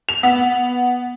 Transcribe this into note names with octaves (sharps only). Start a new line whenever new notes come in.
F7
B3